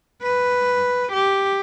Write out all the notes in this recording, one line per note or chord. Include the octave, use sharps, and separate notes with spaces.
B4
G4